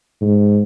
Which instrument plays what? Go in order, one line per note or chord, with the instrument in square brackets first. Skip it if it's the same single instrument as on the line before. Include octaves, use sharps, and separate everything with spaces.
[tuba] G#2